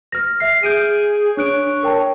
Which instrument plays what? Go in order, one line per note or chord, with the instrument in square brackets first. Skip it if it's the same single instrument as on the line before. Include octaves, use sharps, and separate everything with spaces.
[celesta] F6 A#6
E5 F6 C7
[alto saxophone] G#4 [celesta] G6 D7 D#7
[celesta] D4 F#6 D7 [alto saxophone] C#5
[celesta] A#4 G5 A5